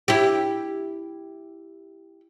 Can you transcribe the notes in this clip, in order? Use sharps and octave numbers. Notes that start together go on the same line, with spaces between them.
E4 G4